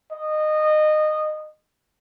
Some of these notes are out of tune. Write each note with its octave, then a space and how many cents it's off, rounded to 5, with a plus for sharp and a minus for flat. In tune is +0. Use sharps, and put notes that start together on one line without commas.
D#5 -20